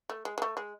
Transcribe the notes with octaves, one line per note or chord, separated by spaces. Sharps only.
A3
G#3
G#3
A3
G#3